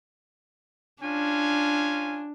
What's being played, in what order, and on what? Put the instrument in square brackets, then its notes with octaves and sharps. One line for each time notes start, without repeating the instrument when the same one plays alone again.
[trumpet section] C#4 F4 G#5 [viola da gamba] D4